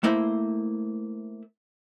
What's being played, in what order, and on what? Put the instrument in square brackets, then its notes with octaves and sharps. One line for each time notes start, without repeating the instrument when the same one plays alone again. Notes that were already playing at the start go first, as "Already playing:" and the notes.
[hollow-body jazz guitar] A3 A#3 E4 C5